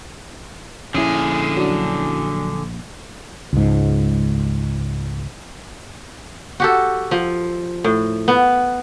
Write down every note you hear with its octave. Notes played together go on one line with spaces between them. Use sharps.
A#1 D3 C#4 E4 G#4
F#3 D4
C#2 G#2
F#4 G4 A4
F3
A2
B3